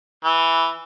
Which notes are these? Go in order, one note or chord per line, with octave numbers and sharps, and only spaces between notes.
E3